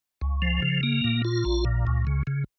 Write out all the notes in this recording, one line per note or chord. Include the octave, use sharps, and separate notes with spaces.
C#2
F3
C#3
A#3
A#2
F4
A#1
A#2
C#2
C#3
C#3